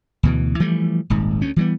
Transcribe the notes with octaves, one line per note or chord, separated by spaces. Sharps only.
D2 B2 E3
E3 F3 G3 A3
D#1 G#1 G#2
D2 C#4
E3 G3 B3